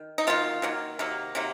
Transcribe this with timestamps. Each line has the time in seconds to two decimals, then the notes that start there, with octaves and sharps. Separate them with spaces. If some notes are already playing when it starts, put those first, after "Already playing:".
Already playing: D#3
0.18 D#4
0.27 D#3 F#3 A#3 F4
0.62 D#3 F#3 A#3
0.99 C3 D#3 F#3 A#3
1.35 C3 D#3 F#3 A#3